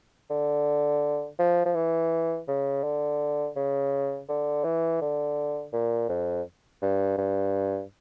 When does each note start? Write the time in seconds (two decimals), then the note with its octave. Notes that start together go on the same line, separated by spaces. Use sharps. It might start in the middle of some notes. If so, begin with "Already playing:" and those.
0.30 D3
1.39 F3
1.66 F3
1.75 E3
2.48 C#3
2.84 D3
3.56 C#3
4.29 D3
4.64 E3
5.01 D3
5.73 A#2
6.09 F2
6.82 G2
7.18 G2